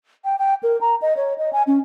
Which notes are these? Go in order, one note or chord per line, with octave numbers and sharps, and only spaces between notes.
G5
G5
A#4
A#5
D#5
C#5
D#5
G#5
C#4